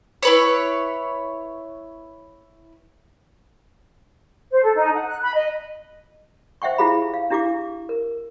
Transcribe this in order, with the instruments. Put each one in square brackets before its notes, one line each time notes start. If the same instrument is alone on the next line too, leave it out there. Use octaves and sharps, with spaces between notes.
[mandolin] E4 B4 C#5
[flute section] C5
A4
D#4
F#5
F#6
B5
D#5
[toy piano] C5 E5 F#5 G5 C#6
E4 F4 G4 G#4 F5 B5
F5
D4 E4 G4 F5 D6
A#4